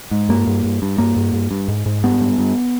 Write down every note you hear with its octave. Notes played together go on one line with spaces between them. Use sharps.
G#2
G2 A#3
G2
G2
G2
G2 A#3
G2
G2
G2
G#2
G#2
G2 B3
G2
G2